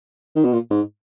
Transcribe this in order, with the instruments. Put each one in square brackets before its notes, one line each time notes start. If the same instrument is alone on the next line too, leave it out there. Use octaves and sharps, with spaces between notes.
[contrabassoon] D#3
B2
A#2
G#2